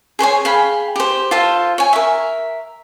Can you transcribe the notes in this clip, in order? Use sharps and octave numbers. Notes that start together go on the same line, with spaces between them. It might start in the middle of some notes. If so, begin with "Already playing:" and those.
G#4 C5 C#5 G#5
G#4 F5 G5 B5
G4 C5
F4 A4 C5 F5
C#5 G#5
A#4 E5